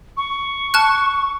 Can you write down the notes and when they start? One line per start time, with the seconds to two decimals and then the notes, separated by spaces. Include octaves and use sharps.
0.17 C#6
0.74 A5 F6 F#6